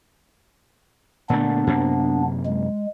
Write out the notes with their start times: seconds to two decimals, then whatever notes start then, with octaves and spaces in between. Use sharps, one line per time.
1.30 A#2 D3 A3 B3 D4
1.67 F#2 C3 A#3
2.45 G#3